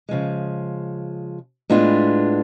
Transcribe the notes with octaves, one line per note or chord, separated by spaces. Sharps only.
C#3 F3 G#3
A2 G#3 B3 D4 F4